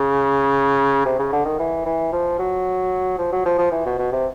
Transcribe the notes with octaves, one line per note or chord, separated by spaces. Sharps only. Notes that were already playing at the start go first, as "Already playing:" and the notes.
Already playing: C#3
C3
C#3
D3
D#3
E3
E3
F3
F#3
F3
F#3
F3
F3
E3
B2
B2
C3